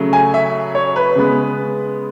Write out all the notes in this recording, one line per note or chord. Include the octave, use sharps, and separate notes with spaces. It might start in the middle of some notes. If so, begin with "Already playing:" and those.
Already playing: C#3 F#3 A3
G#5
E5
C#5
B4
C#3 G#3 B3